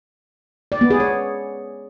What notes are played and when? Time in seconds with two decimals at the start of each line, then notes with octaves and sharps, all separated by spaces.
0.72 D5
0.81 B3
0.91 G#4
1.00 C#5